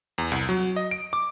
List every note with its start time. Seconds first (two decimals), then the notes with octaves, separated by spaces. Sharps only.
0.18 E2
0.32 C2
0.49 F#3
0.76 D#5
0.91 D7
1.13 D6